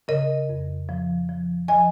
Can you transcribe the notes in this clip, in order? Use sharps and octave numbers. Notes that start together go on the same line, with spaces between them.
C#3 A#4 D#5
F2
F3
F3
F3 D#5 G#5